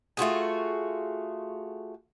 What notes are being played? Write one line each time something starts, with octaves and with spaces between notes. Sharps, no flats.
A3 F4 F#4 G#4